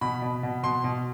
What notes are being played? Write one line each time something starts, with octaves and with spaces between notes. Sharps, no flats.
B2 B5
B2
B2
B2 C6
B2